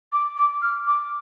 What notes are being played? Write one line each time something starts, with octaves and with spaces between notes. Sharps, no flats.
D6
D6
F6
D6